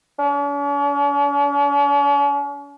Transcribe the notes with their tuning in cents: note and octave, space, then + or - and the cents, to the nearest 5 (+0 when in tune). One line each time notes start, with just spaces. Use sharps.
C#4 +45